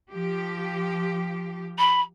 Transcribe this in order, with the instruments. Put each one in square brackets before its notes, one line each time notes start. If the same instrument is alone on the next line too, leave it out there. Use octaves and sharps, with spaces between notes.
[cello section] F3 G4
[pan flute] B5